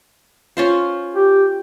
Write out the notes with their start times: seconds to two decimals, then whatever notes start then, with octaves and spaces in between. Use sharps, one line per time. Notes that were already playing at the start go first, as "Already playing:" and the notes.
0.57 C#4 F4 C5
1.16 G4